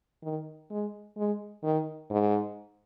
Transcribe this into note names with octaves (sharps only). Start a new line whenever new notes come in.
D#3
G#3
G#3
D#3
G#2